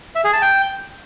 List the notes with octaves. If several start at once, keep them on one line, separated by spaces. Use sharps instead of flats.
E5
G#4
A5
G5